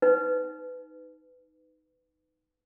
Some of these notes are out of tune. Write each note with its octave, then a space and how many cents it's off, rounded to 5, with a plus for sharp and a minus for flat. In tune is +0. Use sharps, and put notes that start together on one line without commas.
D#4 +0 B4 +15